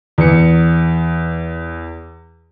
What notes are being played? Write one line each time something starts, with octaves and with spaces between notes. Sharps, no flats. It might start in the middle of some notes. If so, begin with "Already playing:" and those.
E2 C#7